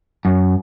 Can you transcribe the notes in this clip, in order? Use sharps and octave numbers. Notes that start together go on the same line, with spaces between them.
F#2